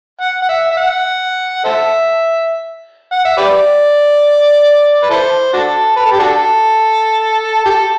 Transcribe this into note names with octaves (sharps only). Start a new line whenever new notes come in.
F#5
F#5
E5
E5
F#5
A4 C5 E5
F#5
E5
G4 B4 D5
B4
E4 A4 C5
D4 F#4 A4
B4
A4
G4
D4 F#4 A4
G4
A4